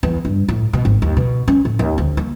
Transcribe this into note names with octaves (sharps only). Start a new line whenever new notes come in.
E2
G2
A2
B2
G#1
D#2
B2
C#4
A2
D#2
D2
A#3